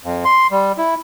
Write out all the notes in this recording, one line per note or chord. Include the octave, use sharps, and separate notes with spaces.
F2
C6
G3
E4